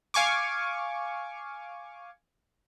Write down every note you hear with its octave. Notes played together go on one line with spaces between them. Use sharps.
F5 G#5 C#6 D6